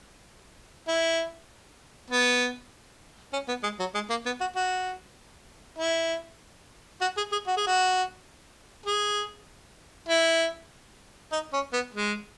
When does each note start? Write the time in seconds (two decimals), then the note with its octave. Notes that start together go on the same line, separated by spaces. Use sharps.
0.88 E4
2.10 B3
3.33 C#4
3.48 B3
3.63 G#3
3.80 F#3
3.95 G#3
4.10 A#3
4.26 B3
4.41 F#4
4.56 F#4
5.78 E4
7.01 F#4
7.17 G#4
7.32 G#4
7.47 F#4
7.57 G#4
7.67 F#4
8.86 G#4
10.09 E4
11.32 D#4
11.53 C#4
11.73 B3
11.94 G#3